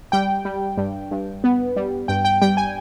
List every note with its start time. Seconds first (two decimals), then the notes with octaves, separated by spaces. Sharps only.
0.12 G3 G5
0.45 G3
0.77 G2
1.11 G2
1.44 B3
1.76 G3
2.08 G2 G5
2.25 G5
2.42 G3 G5
2.57 G#5